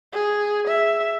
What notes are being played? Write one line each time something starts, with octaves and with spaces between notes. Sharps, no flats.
G#4
E5